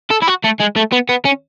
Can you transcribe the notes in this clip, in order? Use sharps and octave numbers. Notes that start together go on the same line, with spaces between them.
A4
E4
F#4
A3
G#3
A3
B3
B3
C#4